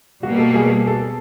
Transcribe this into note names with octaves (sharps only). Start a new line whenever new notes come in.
B2 G3 A#3 F#4
A4
G#4
G#4
A4